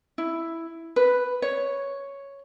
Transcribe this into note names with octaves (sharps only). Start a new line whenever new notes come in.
E4
B4
C#5